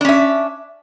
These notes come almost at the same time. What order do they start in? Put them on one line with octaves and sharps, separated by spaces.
D4 C#4 E5